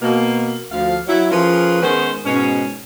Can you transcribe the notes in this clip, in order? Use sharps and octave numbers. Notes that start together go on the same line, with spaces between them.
B2 A#3
D2 F3 F5
F#3 E4
F3 C#4 F4 G#4 A#4 B4
D#3 G#3 B3 C#4 C5
G#2 B2 C#4